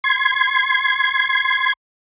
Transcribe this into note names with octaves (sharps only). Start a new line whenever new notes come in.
C6 G#6